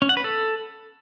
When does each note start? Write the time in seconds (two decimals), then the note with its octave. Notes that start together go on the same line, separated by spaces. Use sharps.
0.02 C#4
0.09 F#5
0.17 B4
0.24 A4